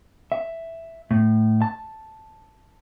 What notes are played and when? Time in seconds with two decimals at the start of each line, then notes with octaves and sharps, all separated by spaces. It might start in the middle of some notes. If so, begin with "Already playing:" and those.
0.32 E5
1.11 A2
1.62 A5